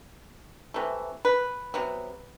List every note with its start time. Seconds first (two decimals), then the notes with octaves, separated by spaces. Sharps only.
0.74 C3 E3 A3
1.25 B4
1.74 C3 F#3 B3